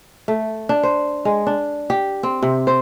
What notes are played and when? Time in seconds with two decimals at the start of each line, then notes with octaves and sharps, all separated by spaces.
0.28 A3
0.69 D4
0.83 C5
1.25 G#3
1.47 D4
1.90 G4
2.23 C4
2.42 C3
2.67 C5